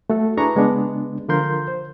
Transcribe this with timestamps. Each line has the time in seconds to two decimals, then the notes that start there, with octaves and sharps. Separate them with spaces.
0.10 A3 F#4 A4
0.37 D4 E4 G#4 B4 A#5 C#6
0.55 C#3 G#3 B3 D4
1.28 D3 F3 F4 A#4 C6 G6
1.68 C5